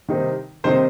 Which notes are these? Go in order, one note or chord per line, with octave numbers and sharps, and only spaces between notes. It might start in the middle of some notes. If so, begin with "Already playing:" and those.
C3 D#3 G3 C4 D#4
C3 D#3 G3 C4 D#4 C5